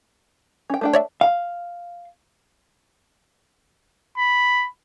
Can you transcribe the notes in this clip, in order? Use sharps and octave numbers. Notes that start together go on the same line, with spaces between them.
C#4 G5
A3 D4 G5
C#5 D5 E5
F5
B5